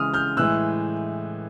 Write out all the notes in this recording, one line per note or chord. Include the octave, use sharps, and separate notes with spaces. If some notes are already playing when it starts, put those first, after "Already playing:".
Already playing: C#3 E3 G#3 D#6 F6
F6 G6
A2 E3 G#3 E6 F#6